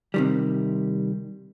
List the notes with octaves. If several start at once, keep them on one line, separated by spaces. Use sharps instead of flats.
C3 D#3 G3